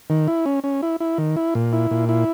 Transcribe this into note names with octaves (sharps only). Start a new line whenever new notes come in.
D#3
E4
C#4
C#4
E4
E4
D#3
E4
A#2
E4
A#2
E4